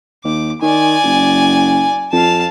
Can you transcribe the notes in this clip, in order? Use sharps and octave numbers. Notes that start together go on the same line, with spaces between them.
D#2 D6
D#3 D5 G#5
F#1
F2 F5 A5